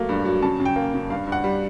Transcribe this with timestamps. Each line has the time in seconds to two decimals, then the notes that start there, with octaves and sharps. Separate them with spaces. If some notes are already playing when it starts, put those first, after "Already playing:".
Already playing: F#3 A3 A#3
0.09 G2
0.25 F#3
0.42 C#3 A5
0.60 C#3
0.65 G5
0.76 A#3
0.94 C#3
1.10 G2 F5
1.27 G2 F#5
1.44 G3